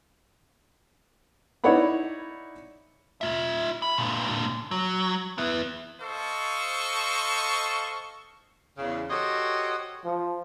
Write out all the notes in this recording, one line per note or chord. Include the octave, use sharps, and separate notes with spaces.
D#4 E4 C#5 D5 F#5 B5
F4 E5
B5
A#2 D3
F#3
B3 E4
A4 C5 D#5 F5 C#6
E2 C#3
F#4 G4 A4 C5 C#5 D#5
F3